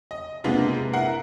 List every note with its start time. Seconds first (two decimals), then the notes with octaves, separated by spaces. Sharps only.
0.11 D#5
0.44 C3 G#3 A#3 B3 D4 F4
0.93 E4 A#4 F#5 C7